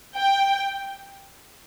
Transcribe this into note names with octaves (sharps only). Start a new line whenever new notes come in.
G5